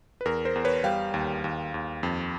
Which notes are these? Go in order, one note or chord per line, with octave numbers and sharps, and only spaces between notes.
B4
E2 A#4
A#4 C5
E2
B4 C#5
G3 F5 G5
D#2
D#2
D#2
F2